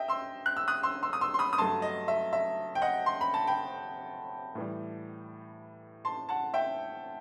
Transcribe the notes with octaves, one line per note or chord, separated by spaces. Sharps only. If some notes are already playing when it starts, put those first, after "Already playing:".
Already playing: D#5 E5 G5
C6 E6
F#6
E6
D#6 F#6
C6 E6
C6 E6
D#6
C6 E6
C6
B5 D#6
D#6
G2 F#3 A3 A5 C6
D#5
E5
E5
G5
D#5 F#5
C6
B5
A5
G5 B5
A2 E3 G3
A5 C6
F#5 A5
E5 G5